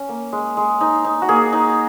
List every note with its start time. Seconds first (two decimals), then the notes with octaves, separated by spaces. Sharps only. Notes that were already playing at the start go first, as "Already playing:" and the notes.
Already playing: C#4
0.09 A#3
0.33 G#3
0.57 G#3
0.81 D#4
1.05 D#4
1.22 F#4
1.29 A#3 G#4
1.53 D#4